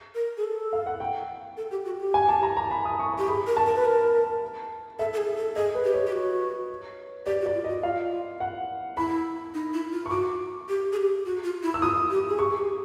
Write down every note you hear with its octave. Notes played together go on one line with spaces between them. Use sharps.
A#4
G#4
A4
F5
F#5
G5
A4
G4
F#4
G4
G#5
A5
A#5
A#5
B5
D#6
C#6
G4 C#6
G#4 B5
A#4
A5
A#4
B4
A#4
A4 E5
A4
G#4
A4
G#4 D#5
B4
G4
C#5
G4
F#4
G4 D5
F#4
D5
F4
F#4 D#5
F4 F5
F#5
E4 B5
D#4
E4
F4
C#6
F#4 D6
G4
G#4
G4
F#4
F4
E4
E6
F4 D#6
G4
G#4
G4 C#6
G#4
G4